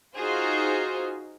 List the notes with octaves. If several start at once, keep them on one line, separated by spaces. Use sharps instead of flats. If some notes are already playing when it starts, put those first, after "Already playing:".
D#4 F4 F#4 G#4 C5